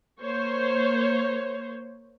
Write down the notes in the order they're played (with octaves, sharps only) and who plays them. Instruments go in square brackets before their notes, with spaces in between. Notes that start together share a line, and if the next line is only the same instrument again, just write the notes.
[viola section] A#3 C5 C#5